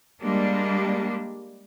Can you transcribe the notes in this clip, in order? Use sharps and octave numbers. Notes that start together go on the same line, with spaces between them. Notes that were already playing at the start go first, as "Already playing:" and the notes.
G3 G#3 A#3 D4